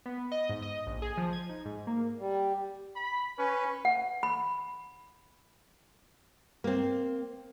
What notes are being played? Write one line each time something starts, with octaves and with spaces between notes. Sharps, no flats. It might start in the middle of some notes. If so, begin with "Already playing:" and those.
B3
D#5
G#2
D#5
A#1
G#4
F3
G#6
D#4
G#2
A#3
G3
B5
C#4 B4
F#5
B5
A#3 C4